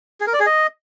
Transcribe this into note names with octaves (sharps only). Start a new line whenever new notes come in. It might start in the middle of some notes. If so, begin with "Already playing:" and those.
G#4
A#4
D5
G#4
D#5